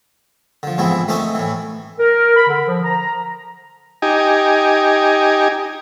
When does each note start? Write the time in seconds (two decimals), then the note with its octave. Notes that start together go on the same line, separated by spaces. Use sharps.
0.63 D3 F3
0.78 G#2 E3 F3 B3 C4 E4
1.08 A3 C4 C#4 D#4 A4
1.35 A2 E3
2.00 A#4
2.37 B5
2.48 D3
2.67 F3
2.84 A#5
4.02 D#4 G4 G#5